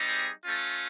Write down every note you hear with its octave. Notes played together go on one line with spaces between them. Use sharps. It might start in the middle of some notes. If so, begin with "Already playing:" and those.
Already playing: G3 C4 D#4 G4
G#4
A3 C#4 F4